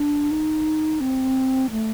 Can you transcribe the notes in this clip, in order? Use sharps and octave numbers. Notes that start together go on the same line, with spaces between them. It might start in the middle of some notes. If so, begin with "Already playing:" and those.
Already playing: D4
D#4
C4
A3